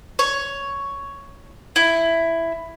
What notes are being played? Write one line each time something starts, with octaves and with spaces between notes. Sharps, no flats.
C#5
E4